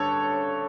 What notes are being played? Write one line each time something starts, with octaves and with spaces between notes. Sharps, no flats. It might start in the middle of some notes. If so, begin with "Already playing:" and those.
Already playing: G2 D3 A4 C#5